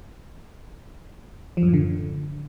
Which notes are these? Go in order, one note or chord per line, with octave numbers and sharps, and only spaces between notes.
F3
F#2
A2
D3